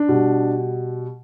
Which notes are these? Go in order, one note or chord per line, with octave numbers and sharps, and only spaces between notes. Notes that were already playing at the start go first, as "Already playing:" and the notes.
Already playing: D4
B2 G3